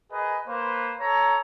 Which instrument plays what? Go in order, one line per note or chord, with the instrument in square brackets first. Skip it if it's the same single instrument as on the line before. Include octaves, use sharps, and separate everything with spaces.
[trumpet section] G#4 A#4 B4 D#5
A#3 B4 C5
A4 C#5 A#5